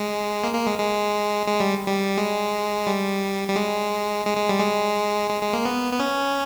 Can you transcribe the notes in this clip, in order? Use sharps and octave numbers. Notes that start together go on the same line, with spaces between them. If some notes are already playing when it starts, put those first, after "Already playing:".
Already playing: G#3
A#3
A#3
G#3
G#3
G#3
G3
G3
G#3
G3
G3
G#3
G#3
G#3
G3
G#3
G#3
G#3
A#3
B3
B3
C#4